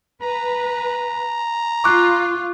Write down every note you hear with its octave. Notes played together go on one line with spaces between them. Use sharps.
B4 A#5
F4 C#6 D6 F#6